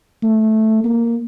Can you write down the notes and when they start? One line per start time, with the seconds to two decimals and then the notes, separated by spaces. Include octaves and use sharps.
0.23 A3
0.84 A#3